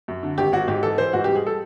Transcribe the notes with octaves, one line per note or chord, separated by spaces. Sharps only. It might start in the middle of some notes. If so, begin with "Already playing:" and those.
F#2
D3
G#1 G4
G#1 F#4
G#2 G4
E3 A4
E3 C5
G#2 F#4
G3 G4
G#4
A4